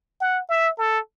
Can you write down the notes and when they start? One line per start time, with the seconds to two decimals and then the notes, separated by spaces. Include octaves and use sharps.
0.21 F#5
0.49 E5
0.79 A4